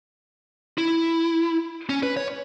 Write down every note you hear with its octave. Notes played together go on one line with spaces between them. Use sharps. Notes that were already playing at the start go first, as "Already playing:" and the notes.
E4
C#4
B4
C#5